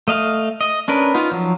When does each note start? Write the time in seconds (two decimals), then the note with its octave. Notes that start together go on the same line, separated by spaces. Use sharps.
0.08 A3 D#5 F5
0.61 D#5
0.88 C#4 D4 A#4 B4
1.14 B3 D#4 F4
1.32 F3 F#3